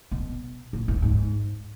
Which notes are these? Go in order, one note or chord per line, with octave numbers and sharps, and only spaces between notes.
B2
A#2
G2
G#2